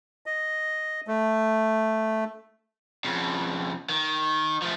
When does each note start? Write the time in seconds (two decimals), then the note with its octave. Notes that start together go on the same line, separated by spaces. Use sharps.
0.26 D#5
1.07 A3
3.05 F2 C#3
3.89 D#3
4.62 F3 A3